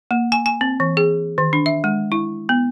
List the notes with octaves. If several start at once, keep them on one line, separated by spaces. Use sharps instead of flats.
A#3
G#5
G#5
C4
E3
G#4
D#3
D4
E5
G#3
E4
B3